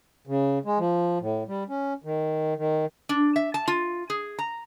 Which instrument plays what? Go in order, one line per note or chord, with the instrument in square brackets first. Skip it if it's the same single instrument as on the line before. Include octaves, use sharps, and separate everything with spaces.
[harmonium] C#3
G#3
F3
A2
G3
C#4
D#3
D#3
[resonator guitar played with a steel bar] D4
E5
A5
F4
G#4
A#5